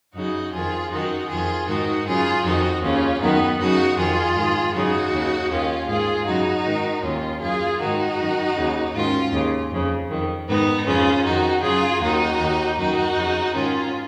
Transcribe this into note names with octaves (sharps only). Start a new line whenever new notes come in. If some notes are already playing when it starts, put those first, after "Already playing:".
F#2 C#3 D#4 F#4
F2 D#3 F4 G#4
F#2 D#3 D#4 F#4
F2 D#3 F4 G#4
G#2 D#3 D#4 F#4
F#2 C#3 F4 G#4
F2 D#3 D#4 F#4
D#2 C#3 C#4 F4
F#2 D#3 B3 D#4
F#2 C#3 D#4 F#4
F2 D#3 F4 G#4
G#2 D#3
F#2 C#3 D#4 F#4
D#2 C#3
D#2 D#3 C#4 F4
G#2 D#3 F4 G#4
F#2 C#3 D#4 F#4
G#2 D#3
D#2 D#3 C#4 F4
F#2 C#3 F4 G#4
G#2 D#3 D#4 F#4
F#2 D#3
D#2 C#3
G#2 D#3 C#4 F4
D#2 C#3
F2 C#3
F2 D#3
G#2 D#3 B3 D#4
F2 C#3 C#4 F4
F2 D#3 D#4 F#4
F#2 C#3 F4 G#4
D#2 D#3 D#4 F#4
D#2 D#3
F#2 D#3 D#4 F#4
F2 C#3
G#2 D#3 C#4 F4